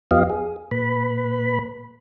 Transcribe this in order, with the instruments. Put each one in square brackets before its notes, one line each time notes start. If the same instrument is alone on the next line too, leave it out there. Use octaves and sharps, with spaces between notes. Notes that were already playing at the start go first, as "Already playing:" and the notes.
[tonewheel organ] F2 B3 F4 G4 D#5 F5
G#4
A#2 B4 B5